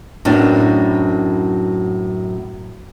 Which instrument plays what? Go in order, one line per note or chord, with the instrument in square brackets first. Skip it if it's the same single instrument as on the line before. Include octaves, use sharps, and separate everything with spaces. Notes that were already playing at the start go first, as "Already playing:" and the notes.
[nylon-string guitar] F#2 A2 F#3 B3 C4 D4